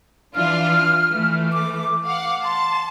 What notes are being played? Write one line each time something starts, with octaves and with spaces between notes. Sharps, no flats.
E3 D4 F4 F6
E3 A3
D6
F5 F#5 D6
A5 C6